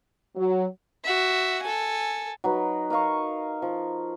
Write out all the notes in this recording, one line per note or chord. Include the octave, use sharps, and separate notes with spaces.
F#3
F#4 E5
A4 G#5
F#3 D#4 B4
A#4 D#5 F5 C#6
F3